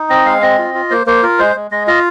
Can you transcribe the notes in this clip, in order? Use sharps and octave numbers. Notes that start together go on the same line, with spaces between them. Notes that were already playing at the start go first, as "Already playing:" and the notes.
Already playing: D#4
C4 D#5
G#3 F5
C4 D#5
F4
F4
A#3 C5
A#3 C5
F4 A#4
G#3 C5
G#3
G#3 D#5
F4 D#5